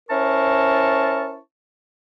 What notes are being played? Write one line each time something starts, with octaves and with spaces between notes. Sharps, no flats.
C#4 E4 A#4 C5 A5 C#6